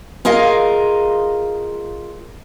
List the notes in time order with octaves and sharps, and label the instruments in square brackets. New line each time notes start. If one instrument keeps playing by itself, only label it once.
[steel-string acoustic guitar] F4 G#4 A#4 D#5 F5